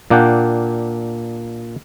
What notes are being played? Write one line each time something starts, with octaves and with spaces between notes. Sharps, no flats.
A#2 A#3 D4 F#5 G5